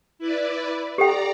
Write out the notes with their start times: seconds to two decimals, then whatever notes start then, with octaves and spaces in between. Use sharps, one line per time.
0.19 E4 B4 D5
0.98 G4 A4 D5 G5 A#5